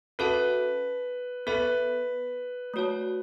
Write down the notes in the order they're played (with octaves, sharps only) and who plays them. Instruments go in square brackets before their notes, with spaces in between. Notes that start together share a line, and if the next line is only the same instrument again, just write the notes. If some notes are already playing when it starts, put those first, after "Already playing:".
[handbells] C#4 F#4 A4 E5 A5 [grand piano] B4
[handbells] B3 A4 E5 [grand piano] B4
[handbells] A3 F#4 C#5 A5